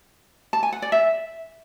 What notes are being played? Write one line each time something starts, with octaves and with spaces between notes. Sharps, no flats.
A5
G#5
F#5
D5
E5